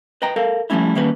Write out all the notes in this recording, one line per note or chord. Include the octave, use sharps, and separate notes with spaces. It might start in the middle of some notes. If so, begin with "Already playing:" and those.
B4 D#5 G5 A#5
A4 A#4 F5
F3 G3 A3 C#4 E4
D#3 G3 A#3 C#4 B4